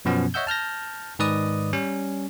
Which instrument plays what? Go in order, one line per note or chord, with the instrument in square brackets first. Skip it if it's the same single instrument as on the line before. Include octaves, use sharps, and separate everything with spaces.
[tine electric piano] F#2 B2 F3 B3 C#4
C#5 D#5 E5 F#5 E6 G6
A5 F6 G6 A#6
G#2 D#3 B4 D5 D#5 D#6
G3 C#4